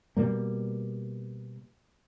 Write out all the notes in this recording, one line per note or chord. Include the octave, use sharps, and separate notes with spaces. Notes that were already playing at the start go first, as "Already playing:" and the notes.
B2 G3 A#3